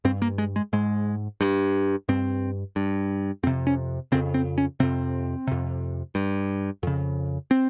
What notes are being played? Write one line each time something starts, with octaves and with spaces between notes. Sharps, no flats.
G2 C4
A#3
G#3
G#3
G#2 G#3
G2
G2 C4
G2
F2 C3 C4
C#4
F2 C#3 C4
C4
C#4
F2 C3 C4
F2 C3
G2
F2 C#3
C4